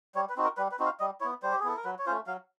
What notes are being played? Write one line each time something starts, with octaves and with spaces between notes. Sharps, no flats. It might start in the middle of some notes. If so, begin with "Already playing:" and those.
G3 C#5
B4
C4 D#4 F#4
A#4
G3 B4
B4
C4 D#4 F#4
F5
G3 D#5
B3 E4 C#5
G3 C5
G4
G#4
B3 E4 A4
A#4
F#3 B4
C#5
A3 C#4 F4 C5
F#3 F5